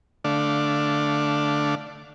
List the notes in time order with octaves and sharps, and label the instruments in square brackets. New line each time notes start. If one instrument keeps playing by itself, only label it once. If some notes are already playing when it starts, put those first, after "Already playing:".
[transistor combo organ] D3 A3 D4 D5 F5